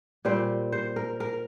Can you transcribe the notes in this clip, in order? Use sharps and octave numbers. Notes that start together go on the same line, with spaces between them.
A#2 G3 C4 C5
C5
A#4
A#4